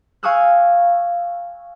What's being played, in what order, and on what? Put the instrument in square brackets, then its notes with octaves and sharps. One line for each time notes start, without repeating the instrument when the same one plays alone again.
[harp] F5 G#5 C#6 D#6 E6 F#6